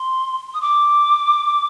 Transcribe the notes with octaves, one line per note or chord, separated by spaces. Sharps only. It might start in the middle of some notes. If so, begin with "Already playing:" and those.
Already playing: C6
D#6
D6